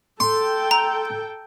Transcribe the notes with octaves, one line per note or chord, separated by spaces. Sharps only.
A4 G5 C6
A#5